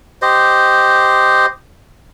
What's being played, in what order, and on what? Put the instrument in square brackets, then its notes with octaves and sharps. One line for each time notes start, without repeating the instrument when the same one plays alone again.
[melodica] G4 C5 D#5